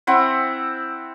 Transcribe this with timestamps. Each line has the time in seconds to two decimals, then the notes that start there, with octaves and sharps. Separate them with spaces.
0.07 C4 E4 F#5